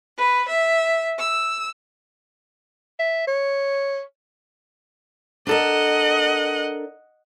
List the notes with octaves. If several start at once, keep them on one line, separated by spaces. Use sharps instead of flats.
B4
E5
E6
E5
C#5
D4 A4 A#4 D#5 F#5